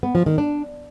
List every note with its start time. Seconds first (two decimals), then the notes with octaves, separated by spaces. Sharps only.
0.03 B3
0.15 F3
0.26 D#3
0.38 D4